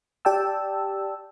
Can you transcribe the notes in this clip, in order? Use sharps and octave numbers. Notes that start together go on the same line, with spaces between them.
G4 D5 G5 A5 E6